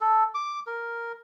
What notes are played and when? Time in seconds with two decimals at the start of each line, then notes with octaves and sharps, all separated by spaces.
0.01 A4
0.34 D6
0.67 A#4